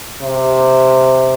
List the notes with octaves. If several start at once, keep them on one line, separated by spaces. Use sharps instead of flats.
C3